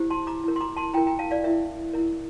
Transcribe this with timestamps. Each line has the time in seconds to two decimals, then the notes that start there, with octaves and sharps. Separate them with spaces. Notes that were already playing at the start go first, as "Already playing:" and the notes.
Already playing: E4 G4 C5
0.11 A5 C6
0.27 A#5 D6
0.44 E4 A#4
0.56 C6
0.61 A#5 D6
0.77 A5 C6
0.93 E4 A#4 G5 A#5
1.07 G5 A#5
1.19 F5 A5
1.31 D5 F5
1.44 E4 A#4 E5
1.94 E4 A#4